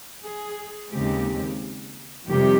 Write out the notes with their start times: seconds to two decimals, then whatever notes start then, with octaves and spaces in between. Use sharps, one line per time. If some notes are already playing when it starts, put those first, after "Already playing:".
0.22 G#4
0.90 D#2 C#3 G#3 C4 G4
2.27 F2 C3 D#3 G3 G4